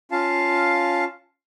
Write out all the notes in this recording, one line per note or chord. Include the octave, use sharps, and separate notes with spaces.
C#4 F4 F5 A5